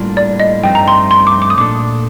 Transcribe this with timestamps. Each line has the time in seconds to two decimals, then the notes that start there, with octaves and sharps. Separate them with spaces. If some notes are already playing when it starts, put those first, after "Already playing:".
Already playing: A2 G3 A#3 D4 F4
0.17 D5
0.40 D#5
0.63 G2 F3 A3 C4 D#4 G5
0.75 A#5
0.88 C6
1.11 C6
1.27 D6
1.42 D6
1.50 D#6
1.58 A#2 A3 D4 A4 D6